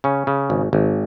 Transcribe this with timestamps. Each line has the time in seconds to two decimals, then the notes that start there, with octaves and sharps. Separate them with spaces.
0.04 C#3 C#4
0.27 C#3
0.50 G#1
0.73 G#1